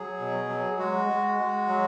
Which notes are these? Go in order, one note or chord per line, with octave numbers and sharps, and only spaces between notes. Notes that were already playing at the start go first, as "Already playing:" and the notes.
Already playing: F#3 G#4
B2
F#3
G#3 F#4
G#3
G#3
F#3